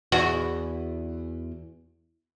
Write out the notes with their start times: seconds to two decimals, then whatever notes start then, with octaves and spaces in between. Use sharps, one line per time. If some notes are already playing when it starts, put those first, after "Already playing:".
0.12 E2 F#4